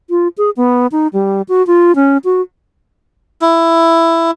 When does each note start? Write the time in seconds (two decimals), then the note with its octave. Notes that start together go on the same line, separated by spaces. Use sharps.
0.10 F4
0.38 G#4
0.57 B3
0.92 D#4
1.13 G3
1.49 F#4
1.67 F4
1.96 C#4
2.25 F#4
3.42 E4